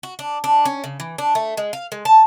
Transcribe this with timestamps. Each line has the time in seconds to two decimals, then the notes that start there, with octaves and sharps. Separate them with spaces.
0.03 F#4
0.19 D4
0.44 D4
0.65 C#4
0.84 C#3
1.00 E3
1.18 D4
1.35 A3
1.57 G#3
1.73 F5
1.92 G#3
2.05 A5